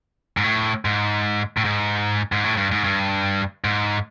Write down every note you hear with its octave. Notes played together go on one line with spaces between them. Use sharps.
G#2
A2
G#2
A2
G#2
G#2
A2
G2
G#2
G2
G#2